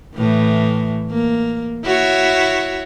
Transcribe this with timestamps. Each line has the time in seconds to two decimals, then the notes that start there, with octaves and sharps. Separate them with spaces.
0.15 A2 E3
1.10 A#3
1.84 E4 F#4 C#5